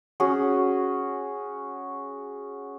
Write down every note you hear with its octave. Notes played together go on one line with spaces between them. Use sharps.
C#4 F#4 G#4